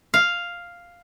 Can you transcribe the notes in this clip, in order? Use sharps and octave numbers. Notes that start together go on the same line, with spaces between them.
F5